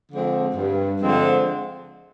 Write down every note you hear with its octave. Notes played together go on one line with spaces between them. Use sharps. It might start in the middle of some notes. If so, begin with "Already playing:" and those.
D3 F3 G#3 C4
G2
D3 F3 G#3 C4